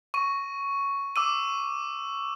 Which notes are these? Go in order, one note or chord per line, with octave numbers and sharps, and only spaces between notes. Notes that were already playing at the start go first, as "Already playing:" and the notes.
C#6 D#7
D6 E6 D#7